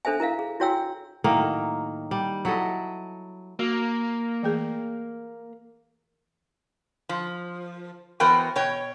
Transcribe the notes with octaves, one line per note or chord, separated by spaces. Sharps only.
D4 A4 C5 E5 G#5
E4 A#4 E5 F5
G#4
E4 F#4 C#5 G5 G#5 E6
A2 D#3 F#3 A#3
G3
F#3 E4 A4 D#5
A#3 F#4
E3 A3 G#4
F3
E3 B3 F#4 A#4 C5 G5
B2 C#5 G5